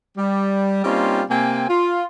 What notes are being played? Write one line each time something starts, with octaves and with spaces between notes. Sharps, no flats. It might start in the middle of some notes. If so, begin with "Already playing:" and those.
G3
G3 A#3 C4 C#4 D#4 F4
C3 A#3 C4 G5 G#5
F4